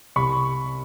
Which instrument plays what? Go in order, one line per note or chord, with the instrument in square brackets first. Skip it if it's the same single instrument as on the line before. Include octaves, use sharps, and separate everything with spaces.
[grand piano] C2 B5 C#6